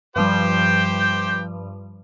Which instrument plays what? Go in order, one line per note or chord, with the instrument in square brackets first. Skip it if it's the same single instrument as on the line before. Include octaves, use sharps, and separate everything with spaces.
[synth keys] G2 F3 G3 [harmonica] G4 C5 G5